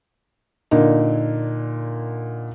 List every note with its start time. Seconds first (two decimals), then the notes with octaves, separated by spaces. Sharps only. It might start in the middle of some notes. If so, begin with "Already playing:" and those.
0.71 A#2 D3 A#3 D#4